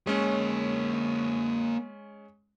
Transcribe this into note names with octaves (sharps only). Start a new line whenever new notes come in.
G#3 A#3 C#4 C#5